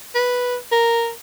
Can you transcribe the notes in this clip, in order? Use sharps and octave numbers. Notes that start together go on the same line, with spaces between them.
B4
A#4